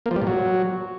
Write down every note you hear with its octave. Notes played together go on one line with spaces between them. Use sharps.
A#3
F3
G3
A#2
F#3